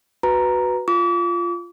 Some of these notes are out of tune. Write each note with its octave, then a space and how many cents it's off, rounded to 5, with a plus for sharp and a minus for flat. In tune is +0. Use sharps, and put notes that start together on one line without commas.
F#4 +0 B4 +0 A#5 +0
F4 -10 D6 -40